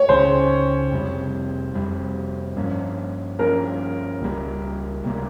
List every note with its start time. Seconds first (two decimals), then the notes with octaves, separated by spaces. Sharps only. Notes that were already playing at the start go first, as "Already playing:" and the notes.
Already playing: C#5
0.09 C#2 C#3 G3 C#4 C5
0.91 F2 C3 G3
1.74 F2 C3 G3
2.56 G2 F3 A#3 C#4
3.39 G2 F3 A#3 C#4 A#4
4.21 C#2 C3 G3 A#3
5.04 C#2 C3 G3 A#3